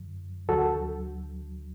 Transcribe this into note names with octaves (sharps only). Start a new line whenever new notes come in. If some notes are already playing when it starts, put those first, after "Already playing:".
Already playing: F#2 D3 F#3
D2 D3 F#3 F#4 A4